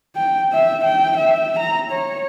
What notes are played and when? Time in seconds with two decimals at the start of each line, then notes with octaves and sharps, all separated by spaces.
0.16 G5
0.53 E5
0.85 G5
1.17 E5
1.59 A#5
1.92 C#5